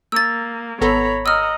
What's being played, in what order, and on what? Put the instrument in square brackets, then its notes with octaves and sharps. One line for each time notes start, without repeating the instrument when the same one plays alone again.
[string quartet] A#3 [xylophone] E6 A6
[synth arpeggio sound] G#1 B3 A4 [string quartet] C#5 A#5 B5
[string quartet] D#5 F#5 A#5 [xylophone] E6 F6